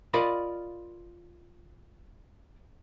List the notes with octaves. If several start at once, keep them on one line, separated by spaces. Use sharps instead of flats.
F4 A#4 D5 D#5 F5 B5